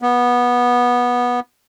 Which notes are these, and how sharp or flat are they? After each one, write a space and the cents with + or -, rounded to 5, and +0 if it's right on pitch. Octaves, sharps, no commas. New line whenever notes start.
B3 -15